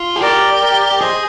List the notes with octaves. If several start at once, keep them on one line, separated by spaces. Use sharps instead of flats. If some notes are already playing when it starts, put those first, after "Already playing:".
Already playing: F4
G#4
G4 A#4 D5
A#4 D5
G#4 C5 D#5